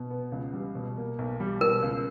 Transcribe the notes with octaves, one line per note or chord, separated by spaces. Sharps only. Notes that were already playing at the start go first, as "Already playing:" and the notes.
Already playing: B2
B3
C#2
G3
B2
A#3
B1
G3
B2 A#4
C#2